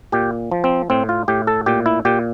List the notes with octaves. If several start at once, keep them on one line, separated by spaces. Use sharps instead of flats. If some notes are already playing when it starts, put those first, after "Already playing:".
A#2 G4
F3
C4
A2 C4
F4
A2 G4
A4
A#2 G4
E4
A#2 G4